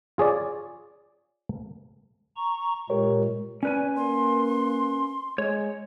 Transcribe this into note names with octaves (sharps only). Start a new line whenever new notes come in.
F4 G#4 C#5 D5
A#5 C#6
A#2 G#3 G4 A#4 C#5
C#4 B4 D5 G#5
A#3 C6
G#3 C#5